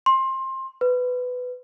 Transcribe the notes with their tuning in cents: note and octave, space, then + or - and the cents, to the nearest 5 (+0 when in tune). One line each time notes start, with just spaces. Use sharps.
C6 +20
B4 +15